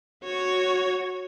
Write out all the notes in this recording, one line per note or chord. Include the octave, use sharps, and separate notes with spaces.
F#4 C#5